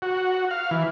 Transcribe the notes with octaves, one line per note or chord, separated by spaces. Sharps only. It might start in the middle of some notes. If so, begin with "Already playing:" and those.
F#4
F5
E3